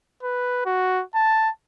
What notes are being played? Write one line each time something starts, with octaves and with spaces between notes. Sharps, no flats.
B4
F#4
A5